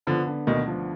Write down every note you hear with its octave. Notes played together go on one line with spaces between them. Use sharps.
D3 F3 B3
D3
D2 B2 D#3
F3